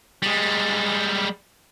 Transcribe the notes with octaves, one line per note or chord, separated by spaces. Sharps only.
G3 G#3